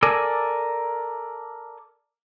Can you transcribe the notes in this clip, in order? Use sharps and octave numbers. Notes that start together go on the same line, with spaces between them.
A4 A#4 D5 G#5